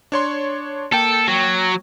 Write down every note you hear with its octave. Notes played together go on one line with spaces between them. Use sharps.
D4 C#5 C6
A#3 A4 G5
F#3